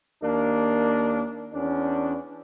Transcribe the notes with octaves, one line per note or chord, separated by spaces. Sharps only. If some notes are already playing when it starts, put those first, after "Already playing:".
D#2 A#3 D4
E2 C#4 D4